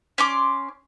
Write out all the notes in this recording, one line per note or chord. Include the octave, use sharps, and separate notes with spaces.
C#4 C6 D6